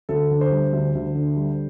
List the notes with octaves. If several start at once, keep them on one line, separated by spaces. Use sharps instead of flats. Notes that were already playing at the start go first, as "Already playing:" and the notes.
D2 A4
D3
C5
G3
D2
D2
D3
G3